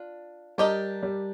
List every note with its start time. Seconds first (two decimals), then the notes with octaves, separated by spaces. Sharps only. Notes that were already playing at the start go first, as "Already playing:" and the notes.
Already playing: D4 F4
0.58 G3 D4 G4 A#4 D#5
1.03 G3